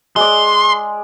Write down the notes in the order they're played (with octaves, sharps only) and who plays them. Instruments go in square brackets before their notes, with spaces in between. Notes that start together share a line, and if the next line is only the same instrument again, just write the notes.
[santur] G#3 D5 [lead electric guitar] C6